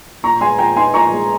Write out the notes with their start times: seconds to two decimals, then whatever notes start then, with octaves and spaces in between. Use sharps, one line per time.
0.23 A#2 A#5 C#6
0.41 G#3 G#5 C6
0.58 A#2 G5 A#5
0.76 D#4 G#5 C6
0.94 A#2 A#5 C#6
1.12 G#3